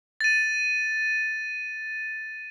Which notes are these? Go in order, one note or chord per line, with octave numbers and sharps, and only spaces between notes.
A6 D#7